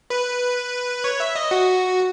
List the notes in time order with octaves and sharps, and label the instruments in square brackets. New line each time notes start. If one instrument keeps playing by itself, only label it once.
[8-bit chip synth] B4
C#5
E5
D#5
F#4